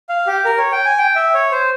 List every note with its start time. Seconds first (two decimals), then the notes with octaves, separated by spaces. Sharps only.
0.09 F5
0.27 G4
0.45 A#4
0.58 C#5
0.72 G5
0.85 G#5
0.98 G5
1.16 E5
1.34 C#5
1.51 C5